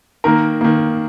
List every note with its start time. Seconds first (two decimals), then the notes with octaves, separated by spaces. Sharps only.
0.24 D#3 A#3 A#4
0.61 D#3 A#3